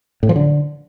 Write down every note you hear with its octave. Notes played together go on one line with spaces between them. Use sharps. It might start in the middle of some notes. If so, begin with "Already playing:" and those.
A2
F3
D3